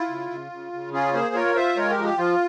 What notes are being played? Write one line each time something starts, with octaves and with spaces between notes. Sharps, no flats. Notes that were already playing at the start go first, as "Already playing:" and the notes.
Already playing: E4 F4
C#3
C#3
C#3
C#3
C#4 F4 G#4
A#3 G#4 C5
F4 A#4 C#5
F4 C5 E5
G#3 A#4 C#5
G4 A#4
F3
G4
F3 F4